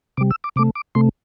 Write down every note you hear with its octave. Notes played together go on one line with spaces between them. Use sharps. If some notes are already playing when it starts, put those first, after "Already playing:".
C3 G3 D6
E6
D6
C3 A3 D6
D6
C3 A3 C6